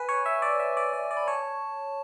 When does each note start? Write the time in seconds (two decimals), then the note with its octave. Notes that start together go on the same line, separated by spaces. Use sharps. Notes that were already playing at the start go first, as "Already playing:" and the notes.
Already playing: B4 G#5
0.09 C#5
0.26 E5
0.42 D5
0.60 E5
0.77 D5
0.93 D5
1.11 D5
1.17 B5
1.27 C#5 A5